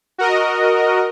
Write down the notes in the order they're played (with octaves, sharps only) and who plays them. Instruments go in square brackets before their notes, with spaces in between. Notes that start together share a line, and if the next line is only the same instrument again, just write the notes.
[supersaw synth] F#4 A#4 D#5